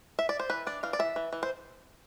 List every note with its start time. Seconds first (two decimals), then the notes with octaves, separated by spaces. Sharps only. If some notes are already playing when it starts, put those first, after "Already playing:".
0.19 E5
0.29 D5
0.40 C5
0.50 E3 B4
0.67 D4 D5
0.83 E3 F5
0.93 D5
0.99 E3 E5
1.16 E3
1.33 E3
1.43 C5